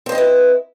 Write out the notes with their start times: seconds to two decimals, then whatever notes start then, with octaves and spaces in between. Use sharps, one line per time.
0.06 C4
0.09 C5
0.12 D#5
0.15 B4
0.18 E4